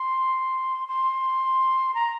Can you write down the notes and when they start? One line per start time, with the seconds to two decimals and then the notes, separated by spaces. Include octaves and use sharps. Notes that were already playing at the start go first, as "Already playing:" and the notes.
Already playing: C6
0.88 C6
1.94 A#5